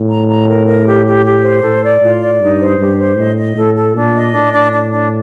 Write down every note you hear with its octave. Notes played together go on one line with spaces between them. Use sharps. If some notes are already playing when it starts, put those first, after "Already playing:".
Already playing: A2
A#5
A#5
A#4
A#4
G4
G4
G4
C5
A2 A4
D5
A2 F4
D5
G2 D#4
C5
G2 G4
C5
A2 D#5
D#5
A2 A4
A4
A#2 D4
D#5
A2 D4
D4
D4
D4